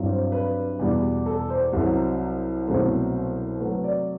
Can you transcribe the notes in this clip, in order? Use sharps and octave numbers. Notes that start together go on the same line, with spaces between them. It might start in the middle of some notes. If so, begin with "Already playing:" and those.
Already playing: G2 F#3 C4 E4
C5
B4
E2 B2 G3
A4
C5
C2 C3 F#3
C2 B2 F#3 A3 C4 C5
C3 F#3 A3 B4
D5